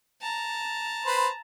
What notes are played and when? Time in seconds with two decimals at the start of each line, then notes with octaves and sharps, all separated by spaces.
0.22 A5 A#5
1.06 B4 C5